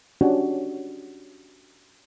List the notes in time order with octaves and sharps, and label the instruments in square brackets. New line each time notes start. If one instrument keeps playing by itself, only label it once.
[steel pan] C#4 D4 F#4 G4 C#5